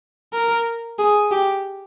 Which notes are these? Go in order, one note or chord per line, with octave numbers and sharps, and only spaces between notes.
A#4
G#4
G4